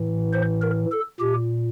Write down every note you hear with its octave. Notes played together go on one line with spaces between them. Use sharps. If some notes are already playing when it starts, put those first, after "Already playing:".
Already playing: A2 E3
C5
A#4
A4
A#2 G4